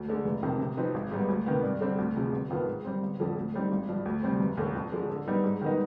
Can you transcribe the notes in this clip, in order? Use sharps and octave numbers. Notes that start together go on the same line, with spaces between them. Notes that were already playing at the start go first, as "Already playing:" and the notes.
Already playing: D2
D3 G#3
F1
F2 C3 D#3
C3
F3 C4 D#4 B4
G#1
G#2 G3 B3
D2
C3 D#3 B3
G2
D3 G3 C4
D2
C3 F3 G#3
G1
F2 D#3 B3 F4
G#2
G3 C4
G1
F2 D3 F3
D2
D3 G3 C4 D#4
G#1
G2 F3
D2
C3 G3 C4
F1
D#2 D3
F2
D3 F3 G#3
D3
G3 B3 D#4
G#2
D#3 G3 B3 D#4